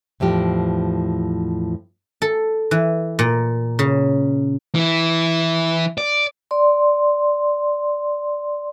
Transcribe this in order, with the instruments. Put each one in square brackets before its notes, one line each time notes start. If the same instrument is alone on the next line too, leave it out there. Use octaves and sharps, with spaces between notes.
[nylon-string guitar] E2 A2 F3 G4
[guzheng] A4
E3
A#2
C#3
[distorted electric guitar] E3 E4
D5
[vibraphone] D5 C6